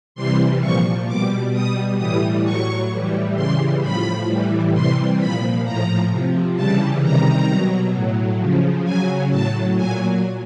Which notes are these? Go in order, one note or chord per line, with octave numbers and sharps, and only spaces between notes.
C3 E3 G3 C6
A#2 F3 C#6
B2 G3 D6
B2 G3 D#6
A2 E3 G3 D#6
A2 F#3 C#6
A2 E3 G3
C#3 E3 G3 C6
A2 F3 B5
A2 E3 G3
C3 E3 G3 C6
A#2 F3 B5
A2 F3 A#5
C3 F3
C#3 E3 G3 A5
C3 D#3 G3 A#5
B2 F#3
A2 F#3
C#3 F3
C#3 F#3 G#5
A2 F#3 A5
A#2 F#3 G#5